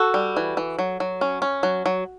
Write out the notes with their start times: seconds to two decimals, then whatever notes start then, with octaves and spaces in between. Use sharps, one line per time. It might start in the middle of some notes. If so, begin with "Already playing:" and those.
Already playing: F#4 A4
0.14 G3
0.37 E3
0.57 E3
0.79 F#3
1.00 F#3
1.21 C#4
1.42 C#4
1.63 F#3
1.86 F#3